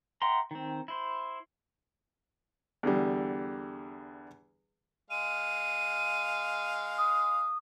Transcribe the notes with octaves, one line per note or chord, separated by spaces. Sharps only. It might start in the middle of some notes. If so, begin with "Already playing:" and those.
E5 F#5 G5 A#5 C6
D#3 C4
E4 C5
E2 D3 G3
G#3 F5 D#7
D#6